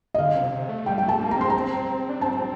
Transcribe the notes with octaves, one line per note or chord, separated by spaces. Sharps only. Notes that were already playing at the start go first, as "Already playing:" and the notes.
D#5
D3 F5
C3
C3
A3
G3 G5
G5
A3
A5
A#3
A#5
C4 C6
C4 A#5
D4
C4 A5